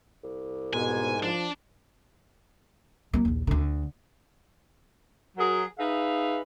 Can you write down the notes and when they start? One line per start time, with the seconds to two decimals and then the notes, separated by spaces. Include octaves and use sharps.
0.24 C2
0.73 G#2 B2 G#5
1.23 F3 D4
3.13 F#3 A#3
3.25 A#1 D#2
3.47 D2 D3
5.38 F#3 F#4 G#4 A#4
5.78 D#4 G#4 B4 E5 F5